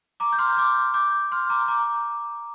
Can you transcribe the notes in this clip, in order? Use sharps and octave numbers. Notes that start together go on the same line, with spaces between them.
A#5 D6
G6
C6 F6
D6 G6
D6 G6
C6 F6
A#5 D6
A#5 D6